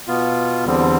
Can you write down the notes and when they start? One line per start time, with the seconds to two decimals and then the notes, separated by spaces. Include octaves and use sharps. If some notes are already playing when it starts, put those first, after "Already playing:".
0.07 B2 B3 F4
0.65 E2 D3 G3 C4